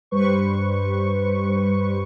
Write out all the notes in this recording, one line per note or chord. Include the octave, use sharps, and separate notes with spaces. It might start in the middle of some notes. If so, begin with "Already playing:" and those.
G2 G3 B4 C5 C#6